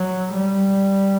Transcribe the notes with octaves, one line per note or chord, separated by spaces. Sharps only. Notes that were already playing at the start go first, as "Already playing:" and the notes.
Already playing: F#3
G3